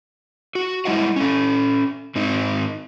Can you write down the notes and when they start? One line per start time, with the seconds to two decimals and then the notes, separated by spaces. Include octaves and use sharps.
0.55 F#4
0.85 G3 G#3 E4 C5 D#5 F#5
1.16 C#4 A4
2.15 G#2 C4 D#4